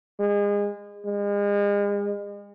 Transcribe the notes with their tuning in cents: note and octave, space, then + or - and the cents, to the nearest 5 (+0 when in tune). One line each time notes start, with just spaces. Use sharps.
G#3 -30
G#3 -40